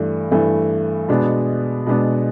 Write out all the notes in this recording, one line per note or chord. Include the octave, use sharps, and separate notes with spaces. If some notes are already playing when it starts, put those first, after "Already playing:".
Already playing: G2 E3 A3
G2 E3 A3
B2 G#3 B3 D4
B2 G#3 B3 D4